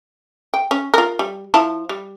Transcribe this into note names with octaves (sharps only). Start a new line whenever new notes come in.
G5
C#4
F4 A#4
G3
F3 E4 A5
G3